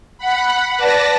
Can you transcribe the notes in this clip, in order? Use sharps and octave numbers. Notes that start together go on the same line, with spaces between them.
F#5 B5
B4 D5 A5 A#6